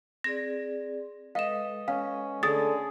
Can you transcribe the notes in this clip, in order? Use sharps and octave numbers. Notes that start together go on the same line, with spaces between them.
C4 G#4 D5 A#6
G#3 A4 B4 D#5 F5 E7
C#4 F5
D3 A3 G#4 D#6 A6